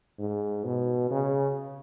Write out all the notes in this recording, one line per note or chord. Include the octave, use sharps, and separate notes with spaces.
G#2
B2
C#3